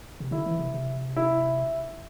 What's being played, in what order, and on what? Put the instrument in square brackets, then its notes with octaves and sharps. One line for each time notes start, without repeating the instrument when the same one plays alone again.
[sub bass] C3
[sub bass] D3 [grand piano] E4
[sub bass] E3
C3
C3
[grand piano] E4